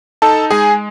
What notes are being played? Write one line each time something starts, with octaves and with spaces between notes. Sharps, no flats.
D#4 A4 A5
G#3 G#4 G#5